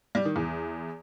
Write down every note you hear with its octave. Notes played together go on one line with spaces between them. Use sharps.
G3
D#3
E2